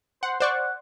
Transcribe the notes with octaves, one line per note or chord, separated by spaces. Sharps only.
C5 F#5
C5 D5 F#5 C#6